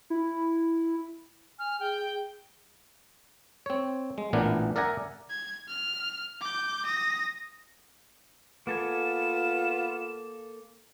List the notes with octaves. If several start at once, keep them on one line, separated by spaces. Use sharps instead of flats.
E4
G#5 F6
G#4 G5
C4 C#5
G#3
A1 A#2 E3 B3 D4 A#4
A#4 D5 E5 F#5 G#5 A#5
G#6
F6
D6 G6
D#6 A#6
A#3 B3 F4 A4 G#5 E7